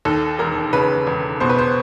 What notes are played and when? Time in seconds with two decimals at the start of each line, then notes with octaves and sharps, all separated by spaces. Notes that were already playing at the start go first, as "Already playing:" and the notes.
0.05 D#2 A4
0.39 E1 A#4
0.73 C#3 B4
1.07 E1
1.40 B2 C5
1.50 B4
1.59 C5